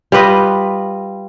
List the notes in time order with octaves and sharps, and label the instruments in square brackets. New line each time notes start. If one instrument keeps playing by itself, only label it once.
[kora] G3 F4 B4 D#5